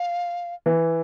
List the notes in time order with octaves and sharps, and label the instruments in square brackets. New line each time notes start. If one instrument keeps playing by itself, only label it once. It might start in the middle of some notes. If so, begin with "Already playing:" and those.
Already playing: [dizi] F5
[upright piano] E3